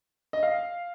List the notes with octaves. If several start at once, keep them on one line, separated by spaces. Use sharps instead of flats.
D#5
F5